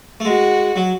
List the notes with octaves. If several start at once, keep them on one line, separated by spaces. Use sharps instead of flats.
A3
G#3 F#4
F#3